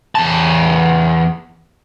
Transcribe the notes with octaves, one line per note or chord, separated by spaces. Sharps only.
E2 A5